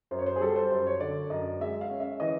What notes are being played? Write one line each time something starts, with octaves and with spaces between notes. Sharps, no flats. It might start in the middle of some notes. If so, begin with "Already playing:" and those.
F#2 C5
C#5
C5
G#4
G3 A4
C5
F#2 C5
C#5
D3 D5
F#2 D#5
G#3 E5
F5
C#4
E5
E3 D#5